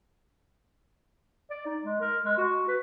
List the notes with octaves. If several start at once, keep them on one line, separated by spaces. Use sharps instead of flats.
D5
D#4
G#3
A#4
G#3
F#4
B4